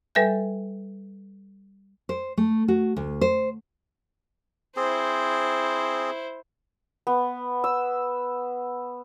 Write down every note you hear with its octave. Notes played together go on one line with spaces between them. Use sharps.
G3 A4 B4 E5 G#5 G6
C5
A3
F#4
D2
C5
C4 E4 G#4 C5
B3
E6